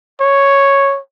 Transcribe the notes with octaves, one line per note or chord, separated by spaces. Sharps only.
C#5